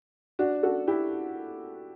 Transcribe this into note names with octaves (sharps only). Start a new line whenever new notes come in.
D4 F#4
F#4 A4
E4 G4